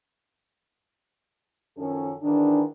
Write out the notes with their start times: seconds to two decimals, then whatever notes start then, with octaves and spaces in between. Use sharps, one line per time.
1.78 F#2 D#3 F3 C#4 A4
2.22 G#2 D#3 E3 D4